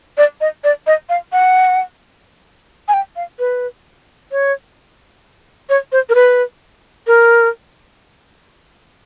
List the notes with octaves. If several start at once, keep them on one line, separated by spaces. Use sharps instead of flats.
D5
D#5
D5
D#5
F5
F#5
G#5
G5
F5
B4
C#5
C#5
C5
A#4
B4
A#4